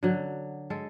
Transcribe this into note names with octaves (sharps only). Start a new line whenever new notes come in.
D3 F#3
G#3 A4